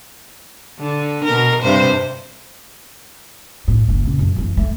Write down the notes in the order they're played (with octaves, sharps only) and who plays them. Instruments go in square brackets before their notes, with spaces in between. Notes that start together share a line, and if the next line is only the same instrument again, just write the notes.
[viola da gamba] D3
B2 A#4
G2 C3 C5
[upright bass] A2
F#1 A#3
A#2 C#3
F#2
E3 A3
A3